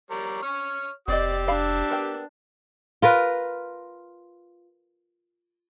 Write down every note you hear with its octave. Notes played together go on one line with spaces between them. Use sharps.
G3 A#4 C#5
C#5 C#6 F6
F1 C4 G4 D5 D#5 E6
D4 D5 F5 B5
B3 A#4 G5
F4 A#4 B4